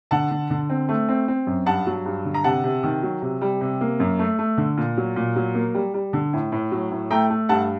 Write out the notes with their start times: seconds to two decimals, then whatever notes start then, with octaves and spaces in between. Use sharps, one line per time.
0.11 D3 F#5 A5
0.31 D3
0.50 D3
0.70 C4
0.89 A3
1.09 C4
1.28 C4
1.47 F#2
1.66 G2 F#5 A5
1.86 F#3
2.05 G2
2.25 D3
2.34 A#5
2.44 C3 F#5 A5
2.64 C3
2.83 D#3
3.03 F#3
3.22 C3
3.41 G3
3.61 C3
3.81 A#3
4.00 F#2
4.19 A3
4.39 A3
4.57 D3
4.77 A#2
4.97 F#3
5.16 A#2
5.36 F#3
5.55 A#3
5.74 G3
5.94 G3
6.13 D3
6.33 A2
6.52 A2
6.72 F#3
6.91 A2
7.10 A3 G5 A#5
7.30 A3
7.49 G2 F#5 A5